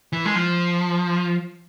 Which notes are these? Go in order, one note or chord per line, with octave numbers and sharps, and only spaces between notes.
E3
G#3
F3